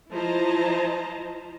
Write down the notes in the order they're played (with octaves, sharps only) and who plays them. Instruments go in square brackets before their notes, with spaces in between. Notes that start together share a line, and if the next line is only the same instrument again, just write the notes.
[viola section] F3 E4 C5 D#5 A5 A#5